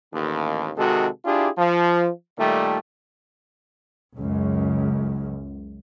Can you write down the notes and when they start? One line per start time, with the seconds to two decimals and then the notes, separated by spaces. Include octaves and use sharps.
0.13 A1 D#2
0.77 C3 D#3 G#3 F#4 A4
1.25 D4 E4 F4 G4 G#4
1.58 F3
2.38 A#2 D#3 G3 A3
4.17 C#2 F#2